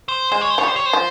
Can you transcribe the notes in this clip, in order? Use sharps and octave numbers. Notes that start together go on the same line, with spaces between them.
C5
G#3 C5
C#5
C5
F3 C#5
G3 C5
C#5
C5
F3